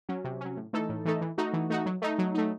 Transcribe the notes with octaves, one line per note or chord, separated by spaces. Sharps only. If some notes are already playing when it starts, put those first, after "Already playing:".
F#3 C#4
C3
F#3 C#4
A2
E3 A3 D#4 A4
A2
E3 A3 D#4 A4
E3
A3 D#4 F#4
E3
A3 D#4 F#4
F#3
A3 D#4
F#3
A3 D#4